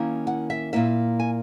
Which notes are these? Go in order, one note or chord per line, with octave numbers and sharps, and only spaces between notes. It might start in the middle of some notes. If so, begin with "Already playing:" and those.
Already playing: D#3 A#3 C#4 E4
F#5
E5
A#2 A#3 E4 E5
G#5